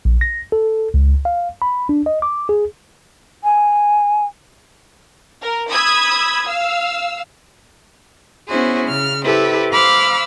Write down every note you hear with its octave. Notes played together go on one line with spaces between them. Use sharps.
A#1
A#6
A4
C#2
F5
B5
D4
D#5
D6
G#4
G#5
A#4
B5 D#6 E6 G#6
F5 E6
B3 C#4 E4 F#4 G#4 C5
C#3 F6
E4 G4 A4 B4 C5
C5 F5 B5 D6 E6 F6